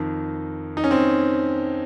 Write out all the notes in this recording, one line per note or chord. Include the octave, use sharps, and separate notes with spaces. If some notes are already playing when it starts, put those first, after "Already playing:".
Already playing: F2 D#3
D#4
C#4
C4